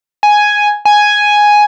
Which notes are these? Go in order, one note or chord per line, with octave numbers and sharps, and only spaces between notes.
G#5
G#5